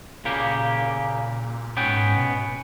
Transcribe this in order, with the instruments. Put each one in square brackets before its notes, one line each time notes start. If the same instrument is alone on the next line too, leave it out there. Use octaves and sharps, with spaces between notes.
[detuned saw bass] A#2 [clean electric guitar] C#3 A#3 G4
[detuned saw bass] G#2 [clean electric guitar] B3 C#4 G5
[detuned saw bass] B2